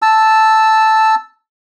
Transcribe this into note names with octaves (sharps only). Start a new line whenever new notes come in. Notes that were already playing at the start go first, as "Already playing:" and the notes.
A5 E6